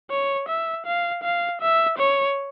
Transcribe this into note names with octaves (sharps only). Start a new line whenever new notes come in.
C#5
E5
F5
F5
E5
C#5